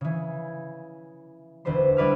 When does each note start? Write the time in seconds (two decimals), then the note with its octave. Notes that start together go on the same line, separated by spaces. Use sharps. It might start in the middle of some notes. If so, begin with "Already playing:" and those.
0.01 C#3 E3
1.65 E1 D2 B4 C5 C6
1.97 G3 D4 E4 B4 D5 F6